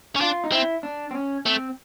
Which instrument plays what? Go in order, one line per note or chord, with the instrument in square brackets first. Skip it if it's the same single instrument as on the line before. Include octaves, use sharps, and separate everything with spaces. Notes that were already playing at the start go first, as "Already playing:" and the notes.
[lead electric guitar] C#4
[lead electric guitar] D4 [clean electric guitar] F4
[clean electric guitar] D#4
[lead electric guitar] C4 [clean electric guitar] E4
[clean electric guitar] D4
C4
C#4
[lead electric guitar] A3 [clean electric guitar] C4